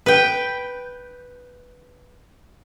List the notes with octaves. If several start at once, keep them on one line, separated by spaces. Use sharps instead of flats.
B4 G5